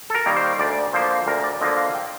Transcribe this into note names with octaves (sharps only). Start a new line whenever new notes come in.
A4
A#4
D#3 G3 A#3
C5
D2 D5
D3 F3 A#3 C5
D2 A#4
D5
D3 F3 A#3 D#5
F5
G5